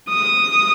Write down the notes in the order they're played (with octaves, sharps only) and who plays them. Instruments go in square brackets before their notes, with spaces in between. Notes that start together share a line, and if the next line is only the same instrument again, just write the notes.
[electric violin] D#6